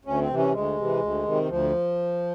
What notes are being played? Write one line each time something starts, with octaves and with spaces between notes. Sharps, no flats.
D2 C#4
C4
C3 E3
C#4
D2 G#3
C3 E3
D2
C3 D#3
D2 F3